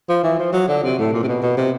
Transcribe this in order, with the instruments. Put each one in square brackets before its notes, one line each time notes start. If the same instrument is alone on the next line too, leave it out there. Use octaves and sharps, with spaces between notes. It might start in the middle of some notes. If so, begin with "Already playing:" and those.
[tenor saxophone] F3
E3
F3
F#3
D3
C3
A2
A#2
C3
B2
B2
C3